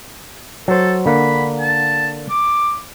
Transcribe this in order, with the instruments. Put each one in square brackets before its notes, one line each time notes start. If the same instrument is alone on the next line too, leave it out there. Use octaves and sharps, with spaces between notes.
[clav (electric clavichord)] F#3 C5 [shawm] A4
[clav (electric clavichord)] D3 A#3 F#5 [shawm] B5
[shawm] A5
D6